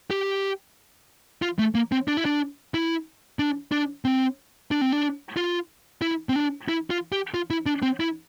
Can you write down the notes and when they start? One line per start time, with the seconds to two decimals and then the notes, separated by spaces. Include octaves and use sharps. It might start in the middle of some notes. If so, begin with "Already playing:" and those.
0.10 G4
1.42 F4
1.59 A3
1.75 A#3
1.92 C4
2.08 D4
2.17 E4
2.25 D4
2.74 E4
3.39 D4
3.72 D4
4.05 C4
4.71 D4
4.81 C4
4.92 D4
5.37 F4
6.02 E4
6.29 C4
6.35 D4
6.68 E4
6.90 F4
7.12 G4
7.34 F4
7.50 E4
7.66 D4
7.82 C4
8.00 E4